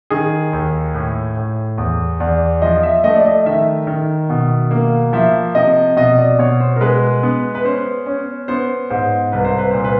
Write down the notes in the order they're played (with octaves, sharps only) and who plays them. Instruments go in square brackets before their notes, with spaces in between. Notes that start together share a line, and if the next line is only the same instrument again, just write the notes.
[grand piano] D#3 G#4
D#2
A2
A2
E2
E2 D5
F3 D#5
E5
A3 D#5
D5
D#5
D#3 E5
D#3
B2
A#3
F3 E5
C3 D#5
B2 D#5
D5
B2 C#5
C5
A#4
G#3 B4
B3
B4
C#4 C5
C#4
B3 C5
G#2 C5
C2 B4
C5
B4
A#2 C5
B4